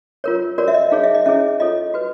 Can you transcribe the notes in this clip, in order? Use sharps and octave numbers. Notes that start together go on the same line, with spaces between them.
F4 A#4 C#5
F#4 A#4 C#5 D5
E5
D#5
D#4 G#4 C#5 F5
E5
D#5
C#4 E4 G#4 C#5 E5
F4 A4 C#5 D#5
F#4 B4